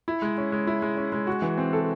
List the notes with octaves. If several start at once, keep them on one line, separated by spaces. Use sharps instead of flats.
E4
G#3
C#4
G#3
E4
G#3
C#4
G#3
F#4
E3
C4
A4